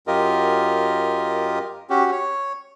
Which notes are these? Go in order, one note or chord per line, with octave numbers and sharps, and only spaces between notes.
F#2 F4 G4 A#4 D#5
C#4 F#4 G4
C#5